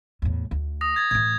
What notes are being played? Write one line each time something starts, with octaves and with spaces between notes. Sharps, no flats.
E2 A2
D2
D#6 A#6
D#6 G#6 A6
A2 E3 G#6